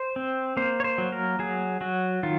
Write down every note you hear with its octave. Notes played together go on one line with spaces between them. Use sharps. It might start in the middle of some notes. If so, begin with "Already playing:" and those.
Already playing: C5
C4
A#3 C5
C#5
C5
F#3
A#4
F#3 G#4
F#3 F#4
D#3 F4